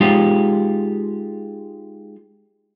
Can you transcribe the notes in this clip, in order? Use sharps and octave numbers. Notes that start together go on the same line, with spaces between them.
G#3 D#4 F4 G4